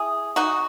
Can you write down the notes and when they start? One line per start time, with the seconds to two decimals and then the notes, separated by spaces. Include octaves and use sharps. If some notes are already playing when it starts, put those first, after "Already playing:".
Already playing: E4 G#4
0.36 D#4 F#4